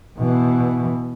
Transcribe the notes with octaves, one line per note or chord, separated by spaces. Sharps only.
B2 E3